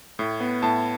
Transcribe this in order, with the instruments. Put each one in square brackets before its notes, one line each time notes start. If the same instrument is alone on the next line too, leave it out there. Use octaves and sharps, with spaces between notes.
[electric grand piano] A2
B3
A2 A5